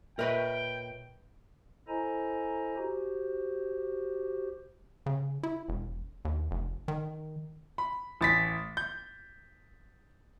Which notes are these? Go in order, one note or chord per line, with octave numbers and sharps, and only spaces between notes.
A#2 A#4 B4 C#5 D#5 E5 G5
E4 A4 C5 D#5 G#5 A#5
F#4 G4 C5
C#3
E4
E1
D#2
F1
D#3
B5
A1 A6 B6
G6